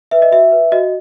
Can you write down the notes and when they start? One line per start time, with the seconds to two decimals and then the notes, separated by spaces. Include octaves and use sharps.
0.11 B4 E5
0.22 D#5
0.32 F#4 E5
0.52 B4
0.72 F#4 D#5